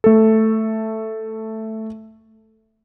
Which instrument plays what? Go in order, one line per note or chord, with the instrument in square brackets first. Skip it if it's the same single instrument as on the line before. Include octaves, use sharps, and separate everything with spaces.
[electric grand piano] A3 A4